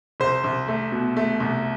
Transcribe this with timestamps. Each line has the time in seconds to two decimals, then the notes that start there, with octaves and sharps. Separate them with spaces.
0.20 C2 C5
0.44 C2
0.68 A3
0.92 B2
1.17 A3
1.40 C2